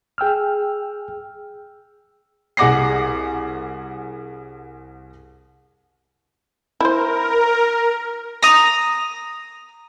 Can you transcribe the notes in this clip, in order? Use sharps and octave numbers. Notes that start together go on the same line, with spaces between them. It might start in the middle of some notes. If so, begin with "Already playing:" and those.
G#4 G5 E6 F6
C2 G#4 F#5 D6 A#6 C7
E4 A#4 C5
A#5 D#6